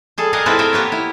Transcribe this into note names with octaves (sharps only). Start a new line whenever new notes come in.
G3 G#4 A4
G#4 A#4 D5 D#5 F5 F#5
G#3 C4 E4 F4 A4 B4
A4 A#4 E5 F5 G5 G#5
A#3 B3 G4 B4 C#5
E4